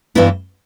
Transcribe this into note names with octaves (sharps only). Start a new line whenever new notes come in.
G2 E3 B3 E4